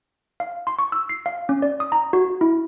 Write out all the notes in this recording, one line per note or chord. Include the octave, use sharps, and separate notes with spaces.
F5
C6
C#6
E6
C7
F5
C#4
D5
D#6
A#5
F#4
E4